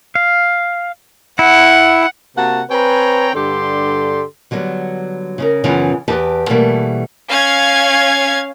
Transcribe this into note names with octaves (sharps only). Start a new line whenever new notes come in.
F5
E4 F#5
C3 A#3 F#4 F#5 A5 A#5
C4 B4 C#5 G5 G#5 A#5
G2 D3 G4 A4 D5 C6
D3 F#3 G3 B3
C#3 C#4 A#4
F#2 C#3 E3 F3 B3 C#4
E2 G4 B4 A5
B2 E3 G3 A3 A#3
C#4 F5 G#6